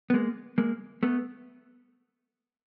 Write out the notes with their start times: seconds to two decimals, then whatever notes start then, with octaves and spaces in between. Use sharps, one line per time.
0.10 B3
0.14 G#3 A#3
0.58 G#3 A#3
1.03 A3 B3